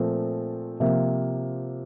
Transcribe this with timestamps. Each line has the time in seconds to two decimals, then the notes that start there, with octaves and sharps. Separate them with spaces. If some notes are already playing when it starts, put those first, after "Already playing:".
Already playing: A#2 F3 A3 C4
0.80 C3 F3 A#3 F4